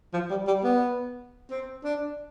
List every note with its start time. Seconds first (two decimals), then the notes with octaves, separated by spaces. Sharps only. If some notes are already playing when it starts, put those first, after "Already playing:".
0.13 F3
0.30 G3
0.47 G3
0.64 B3
1.50 C4
1.84 D4